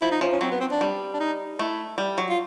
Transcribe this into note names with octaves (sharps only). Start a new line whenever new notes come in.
F3 E4
D#4
F3 C#4
C#4
F#3 C4
B3
C4
D4
G3
D4
D#4
A3 E4
G3
F#3
F4